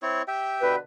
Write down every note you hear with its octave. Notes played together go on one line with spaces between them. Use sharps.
C4 E4 C#5
G4 E5 G5
B2 D3 B4